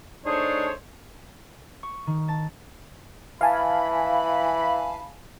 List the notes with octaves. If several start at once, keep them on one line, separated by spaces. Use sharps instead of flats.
A3 D4 D#4 G#4 C5 C#5
C#6
D#3
A5
E3 F5 G#5 A5 B5